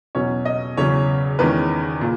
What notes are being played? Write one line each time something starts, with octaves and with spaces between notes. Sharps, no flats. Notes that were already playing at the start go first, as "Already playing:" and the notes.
E2 B2 F#3 C#4 C#5
D#5
E2 C#3 F#3 C#4 C#5
E2 D#3 G#3 C#4 B4
A#2